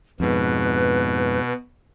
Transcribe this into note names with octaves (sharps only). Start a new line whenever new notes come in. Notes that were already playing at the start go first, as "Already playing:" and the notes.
F2 G#2 B2 B4